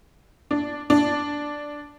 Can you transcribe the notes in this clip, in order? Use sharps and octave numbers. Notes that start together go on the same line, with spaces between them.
D4
D4